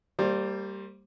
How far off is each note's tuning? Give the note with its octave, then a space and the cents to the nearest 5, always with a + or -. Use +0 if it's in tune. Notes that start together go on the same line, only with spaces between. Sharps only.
G3 +0 A#3 -30 C5 +20